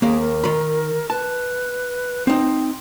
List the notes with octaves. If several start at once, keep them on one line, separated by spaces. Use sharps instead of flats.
D#2 A#3 G#4
A#4
D#3 B5
B4 A5
C4 D#4 G5